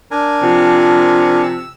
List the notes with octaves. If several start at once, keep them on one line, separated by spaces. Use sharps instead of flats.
D4 A#4 G#5
C3 F3
E6